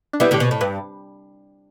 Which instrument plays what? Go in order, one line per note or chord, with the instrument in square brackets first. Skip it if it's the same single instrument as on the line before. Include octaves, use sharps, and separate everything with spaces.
[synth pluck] D4
[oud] G3 B3 [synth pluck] E4
[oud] A2 D3 [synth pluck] G4
[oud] B2
A2
[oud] G2 [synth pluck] B4